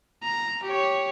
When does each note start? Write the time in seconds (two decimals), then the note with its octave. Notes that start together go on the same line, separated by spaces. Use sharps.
0.23 A#5
0.64 G4 C#5